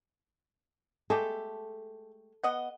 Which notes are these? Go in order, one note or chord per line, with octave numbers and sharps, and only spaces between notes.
G#3 A3 G4 A4
B3 D#5 F#5